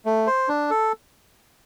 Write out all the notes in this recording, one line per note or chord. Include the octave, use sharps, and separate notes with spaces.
A3
C5
D4
A4